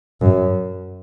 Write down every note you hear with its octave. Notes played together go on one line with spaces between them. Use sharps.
F#2